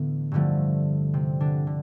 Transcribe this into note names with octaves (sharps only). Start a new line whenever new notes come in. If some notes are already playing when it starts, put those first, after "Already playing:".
Already playing: A2 D3 E3 A3 B3 D4
G2 D3 F3 A3
C3 C4
D3 D4
D3